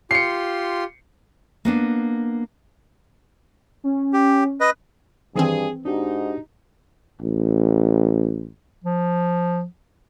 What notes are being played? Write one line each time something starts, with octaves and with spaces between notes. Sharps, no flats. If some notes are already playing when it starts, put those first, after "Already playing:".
F4 G4 C6 C7 C#7
A#3 B3 D4
C#4
G4
B4 D#5
G2 D#3 E3 C4 G#4
G#2 D4 D#4 F#4 G4
A1
F3